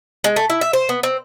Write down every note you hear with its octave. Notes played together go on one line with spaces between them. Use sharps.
G#3
A3
E4
E5
C5
B3
C4